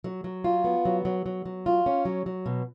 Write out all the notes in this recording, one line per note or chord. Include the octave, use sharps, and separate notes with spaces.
F#3
F#3
F4
B3
F#3
F#3
F#3
F#3
F4
C#4
F#3
F#3
B2